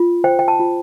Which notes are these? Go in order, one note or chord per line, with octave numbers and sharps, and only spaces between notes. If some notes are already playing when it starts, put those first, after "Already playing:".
Already playing: F4
C5 G5
G5
A5
F4